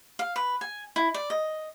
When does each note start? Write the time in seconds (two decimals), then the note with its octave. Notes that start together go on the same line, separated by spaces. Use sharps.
0.19 F5
0.36 B4
0.61 G#5
0.96 E4
1.14 D5
1.30 D#5